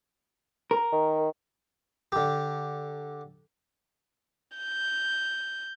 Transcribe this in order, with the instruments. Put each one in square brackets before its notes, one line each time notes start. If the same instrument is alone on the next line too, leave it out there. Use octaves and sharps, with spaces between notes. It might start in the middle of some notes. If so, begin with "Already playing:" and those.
[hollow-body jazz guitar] A#4
[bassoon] D#3
[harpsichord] D3 G4
[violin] G6